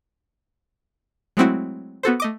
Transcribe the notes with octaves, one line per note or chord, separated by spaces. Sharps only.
F#3 G#3 A3 C4 E4 F#4
B3 F#4 A4 C5
A3 D#5 D6